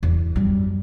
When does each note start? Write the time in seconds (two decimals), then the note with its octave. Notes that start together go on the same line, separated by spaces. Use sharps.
0.03 E2
0.36 F#2 G3